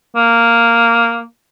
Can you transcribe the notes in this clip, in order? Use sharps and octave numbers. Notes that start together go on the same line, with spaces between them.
A#3